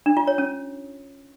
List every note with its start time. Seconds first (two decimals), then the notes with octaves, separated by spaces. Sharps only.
0.06 D4
0.17 F4
0.27 C#5
0.38 C#4